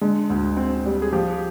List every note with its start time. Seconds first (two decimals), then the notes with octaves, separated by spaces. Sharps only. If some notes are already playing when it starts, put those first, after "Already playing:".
0.01 D3 G#3
0.30 D2
0.57 C4
0.86 G3
1.02 G#4
1.13 F3 G4